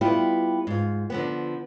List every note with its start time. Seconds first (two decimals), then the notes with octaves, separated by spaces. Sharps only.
0.01 G3 B3 E4 F4 G4
0.67 G#2 F4
1.10 D3 F3 B3